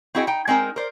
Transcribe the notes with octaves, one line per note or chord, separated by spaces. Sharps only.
C4 E4 F#4 G#4 D#5 G5
D#4 G5
G#3 C4 D#4 A#4
A#4 C5 D5